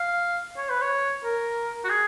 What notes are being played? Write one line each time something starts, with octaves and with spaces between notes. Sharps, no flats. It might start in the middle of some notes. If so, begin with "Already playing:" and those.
Already playing: F5
C#5
B4
C#5
A#4
F#4
G#4